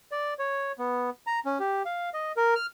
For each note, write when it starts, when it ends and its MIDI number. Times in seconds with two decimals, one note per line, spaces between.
0.12 0.34 74
0.39 0.72 73
0.79 1.10 59
1.27 1.39 82
1.45 1.58 61
1.60 1.83 67
1.85 2.10 77
2.14 2.32 75
2.37 2.54 70
2.56 2.66 89